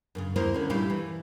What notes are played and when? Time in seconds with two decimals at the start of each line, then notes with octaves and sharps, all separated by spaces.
0.15 F#2 A2 C#3
0.36 D#2 A#3 E4 A#4 C5
0.54 D3 C#4
0.70 A#2 G3 A3 E4 G4 F5
0.90 E3